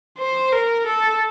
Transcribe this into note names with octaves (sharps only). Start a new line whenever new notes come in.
C5
A#4
A4